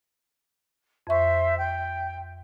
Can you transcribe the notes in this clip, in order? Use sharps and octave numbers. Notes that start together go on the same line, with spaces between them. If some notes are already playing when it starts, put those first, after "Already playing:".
F2 C5 E5 C#6
G5